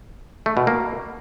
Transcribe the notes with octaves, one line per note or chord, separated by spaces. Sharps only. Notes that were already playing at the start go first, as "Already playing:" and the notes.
A3
B2
A#3